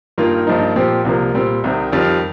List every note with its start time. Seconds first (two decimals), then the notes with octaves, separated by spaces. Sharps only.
0.18 G2 D#3 A#3 F4
0.47 G2 F3 A#3 D#4
0.76 A#2 F3 C4 G4
1.05 C2 C3 F3 A#3
1.34 A#2 G3 C4
1.64 C2 C3 D#3
1.92 F2 D#3 G3